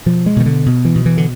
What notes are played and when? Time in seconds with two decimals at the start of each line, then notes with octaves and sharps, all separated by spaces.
0.06 B2 F3
0.26 G#3
0.36 B2 D#3
0.46 D3
0.66 B2
0.85 E3
0.96 B2
1.06 E3
1.17 D3